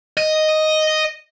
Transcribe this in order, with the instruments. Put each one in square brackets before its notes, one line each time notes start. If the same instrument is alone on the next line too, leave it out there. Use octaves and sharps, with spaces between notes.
[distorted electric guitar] D#5